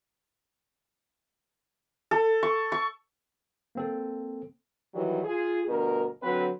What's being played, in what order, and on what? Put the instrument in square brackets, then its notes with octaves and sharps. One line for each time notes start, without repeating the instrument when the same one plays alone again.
[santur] A4
C#6
C#6
[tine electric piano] A#3 C4 A4
[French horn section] D#3 E3 F#3 G3
F4 G#4
D2 G2 B2 A#4
D3 F#3 C4 B4